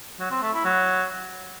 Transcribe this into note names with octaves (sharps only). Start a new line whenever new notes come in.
F#3
C4
A3
E4
F#3